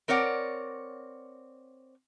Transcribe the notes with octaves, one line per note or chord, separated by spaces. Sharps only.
C4 A#4 C#5 D5 F#5